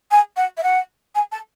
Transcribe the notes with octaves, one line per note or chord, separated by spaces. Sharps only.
G#5
F#5
E5
F#5
G#5
A5